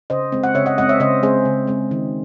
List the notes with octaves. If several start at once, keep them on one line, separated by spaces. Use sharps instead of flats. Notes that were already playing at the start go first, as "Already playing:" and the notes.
C#3 C5 D#5
G#3 C4
F#5
C#3 C#5 E5
D#5 F#5
G#3 C4 D#5 F#5
C#5 E5
C#3 C5 D#5
G#3 C4 G#4 C5
C#3
G#3 C4
D#3